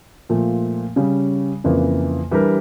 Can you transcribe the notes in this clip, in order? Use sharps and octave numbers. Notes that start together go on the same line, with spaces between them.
A#2 F3 A3
C#3 G3 C#4
F2 C#3 E3 A#3
E3 G3 D4 G4 A#4